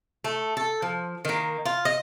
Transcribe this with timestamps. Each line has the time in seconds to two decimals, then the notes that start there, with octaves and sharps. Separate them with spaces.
0.24 A3
0.57 A4
0.82 F3
1.25 D#3 A#3
1.66 F4
1.85 D#5